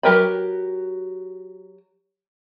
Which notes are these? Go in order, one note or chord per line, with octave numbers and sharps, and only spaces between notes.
F#3 G4 A#4 B4 B5